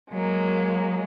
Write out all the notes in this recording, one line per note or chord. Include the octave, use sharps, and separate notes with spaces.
F#3 G#3 A#3